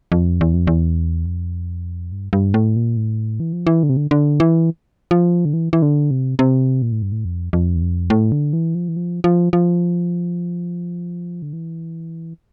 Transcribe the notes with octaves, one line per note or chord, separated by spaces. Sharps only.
F2
E2
F2
E2
F2
G2
G2
A2
A#2
A2
E3
F3
E3
D3
C3
D3
D3
E3
F3
D3
E3
E3
D3
C3
C3
A#2
A2
G2
A2
F2
F2
E2
F2
A2
D3
E3
F3
E3
F3
F3
F3
D3
E3